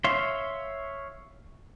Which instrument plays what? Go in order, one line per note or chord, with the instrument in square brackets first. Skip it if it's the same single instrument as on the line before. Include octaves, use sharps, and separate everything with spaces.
[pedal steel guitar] C#5 E5 F5 C6